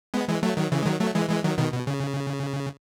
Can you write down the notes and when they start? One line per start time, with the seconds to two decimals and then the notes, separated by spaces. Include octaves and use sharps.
0.14 G#3 B3
0.28 E3 G#3
0.43 F#3 A3
0.57 D#3 F#3
0.72 C#3 E3
0.83 G#3
0.86 D#3 F#3
1.00 F#3 A3
1.15 E3 G#3
1.29 E3 G#3
1.44 D#3 F#3
1.58 B2 D#3
1.73 B2
1.87 C#3